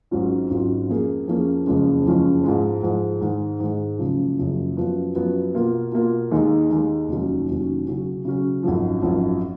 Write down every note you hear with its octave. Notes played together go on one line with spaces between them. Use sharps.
G#1 G#2 F#3 C#4 F4
G#1 G#2 F#3 C#4 F4
F2 F3 A#3 C#4 G#4
F2 F3 A#3 C#4 G#4
F#1 F2 F3 G#3 C#4
F#1 F2 F3 G#3 C#4
G#2 F3 G#3
G#2 F3 G#3
G#2 D#3 G#3
G#2 D#3 G#3
F#1 F#2 C#3 F3
F#1 F#2 C#3 F3
F#2 F3 B3 F#4
F#2 F3 B3 F#4
B2 A#3 F4
B2 A#3 F4
D#2 D#3 G#3 D#4
D#2 D#3 G#3 D#4
F1 D#2 D#3 F#3 C#4
F1 D#2 D#3 F#3 C#4
C#3 F#3 C#4
C#3 F#3 C#4
G#1 F#2 F3
G#1 F#2 F3